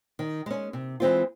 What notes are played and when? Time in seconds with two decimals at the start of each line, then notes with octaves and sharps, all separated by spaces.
0.19 D#3
0.46 G#3 C#4
0.73 C3
1.00 E3 G#3 C4 F4